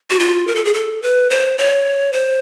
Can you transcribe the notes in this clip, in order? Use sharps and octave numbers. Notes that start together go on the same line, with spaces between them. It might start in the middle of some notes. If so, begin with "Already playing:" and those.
F#4
F4
A#4
A4
G#4
A4
B4
C5
C#5
C5